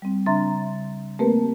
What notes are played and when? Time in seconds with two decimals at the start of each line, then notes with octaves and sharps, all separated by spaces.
0.02 G3 C4
0.26 C#3 D4 E5 A#5 C6 A6
1.19 A3 A#3 C4 G4 A#4 B4